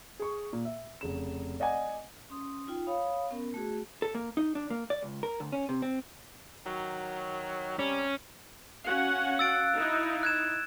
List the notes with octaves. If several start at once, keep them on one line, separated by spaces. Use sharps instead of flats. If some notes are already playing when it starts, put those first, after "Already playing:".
G#4 C#6
A#2
E5
F1 C#3 E7
D5 D#5 F#5 G#5
C#4 C6 D#6
D#4 F4 G5
C#5 F5 B5 D#6
B3 C#4 A#4
A3 F#4 G#4
A4
A#3
D#4
D4
A#3
D5
C#2
A#4
D2
C#4
C3
C4
D#3 F#3
C3 G3 C#4
C#4 F#4 F5 F#5 F#6
E6 A6 D7
D#4 E4
F#6 G#6 E7